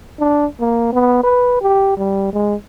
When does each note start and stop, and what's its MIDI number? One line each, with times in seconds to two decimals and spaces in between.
0.20 0.46 62
0.60 0.88 58
0.93 1.21 59
1.24 1.59 71
1.61 1.96 67
1.97 2.31 55
2.33 2.55 56